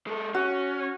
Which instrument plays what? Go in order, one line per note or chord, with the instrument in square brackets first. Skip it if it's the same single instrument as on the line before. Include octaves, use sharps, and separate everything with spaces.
[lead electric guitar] G#3 A4
[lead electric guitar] C#4 [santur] F#4